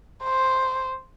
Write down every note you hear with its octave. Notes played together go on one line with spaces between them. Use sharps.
C5